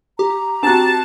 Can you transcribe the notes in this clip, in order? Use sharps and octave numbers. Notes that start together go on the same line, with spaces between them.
G4 A#5
C4 F#4 A5